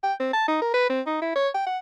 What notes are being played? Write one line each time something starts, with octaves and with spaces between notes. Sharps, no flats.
G5
C4
A5
D#4
A#4
B4
C4
D#4
E4
C#5
G5
F#5